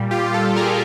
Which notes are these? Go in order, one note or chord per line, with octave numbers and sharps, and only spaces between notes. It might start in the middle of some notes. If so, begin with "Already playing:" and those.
Already playing: A#2 G3
F4 G4
G4 A4
A#2 G3 G#4 A#4